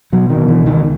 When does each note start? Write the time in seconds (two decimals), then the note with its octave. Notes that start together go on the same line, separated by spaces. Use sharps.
0.12 B2 F#3
0.30 D#3
0.36 B2
0.48 E3
0.60 C#2
0.66 D#3